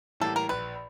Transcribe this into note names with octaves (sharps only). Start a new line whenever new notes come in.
A2 E3 G3 A#3 A4
A#4
A#1 B4